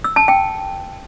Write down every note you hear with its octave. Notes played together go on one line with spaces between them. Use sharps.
E6
A5
G5